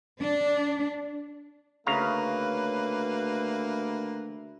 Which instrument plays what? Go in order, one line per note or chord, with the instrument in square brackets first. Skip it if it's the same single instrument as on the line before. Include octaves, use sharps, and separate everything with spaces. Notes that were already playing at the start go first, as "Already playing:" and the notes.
[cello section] D4
[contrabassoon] D2 [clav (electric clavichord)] C#3 F5 A#5 [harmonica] A#3 E5 [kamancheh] B4